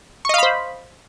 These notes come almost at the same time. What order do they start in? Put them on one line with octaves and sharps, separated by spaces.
C#6 D#5 F5 B5 C5